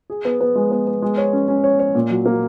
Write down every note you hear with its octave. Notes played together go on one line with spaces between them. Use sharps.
G#4
B3
B3
G#3
B3
B3
G#3
C#5
C#4
C#4
C#5
C#5
A#2
F#3
A#3